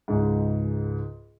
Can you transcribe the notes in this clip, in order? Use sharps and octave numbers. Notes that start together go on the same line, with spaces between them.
C#2 G#2